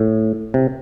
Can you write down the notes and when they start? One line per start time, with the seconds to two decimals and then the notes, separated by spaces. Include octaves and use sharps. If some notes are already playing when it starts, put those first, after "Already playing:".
Already playing: A2
0.54 C3